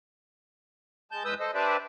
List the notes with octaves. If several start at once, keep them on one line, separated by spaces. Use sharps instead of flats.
G#3 A5 G6
E2 G#3 B4 D#6 E6 G6
A4 C5 D#5
D4 G4 B4 C5 D5 E5